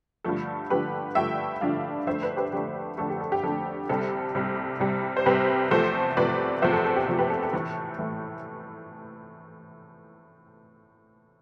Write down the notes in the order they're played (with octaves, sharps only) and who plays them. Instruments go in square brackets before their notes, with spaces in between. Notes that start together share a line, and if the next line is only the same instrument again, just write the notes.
[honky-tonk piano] G2 D3 F3 A3 A4
G2 D3 F3 A3 G4 B4
G2 D3 F3 A3 E5 G5
G2 D3 F3 A3 D5 F5
F2 D3 A3 C5 E5
B4 D5
G4 B4
F2 D3 A3 G4
F2 D3 A3 A4
G4
A4
G4
F2 D3 A3 A4
C2 C3 G3 A4
C2 C3 G3
C2 C3 G3
C5
C2 C3 G3 G4 B4
E2 C3 F3 A3 A4 C5
E2 C3 F3 A3 B4 D5
E2 C3 F3 A3 C5 E5
A4
A4
G4
E2 C3 F3 A3
G4 B4
A4
A4
A2 E3 A3
A2 E3 A3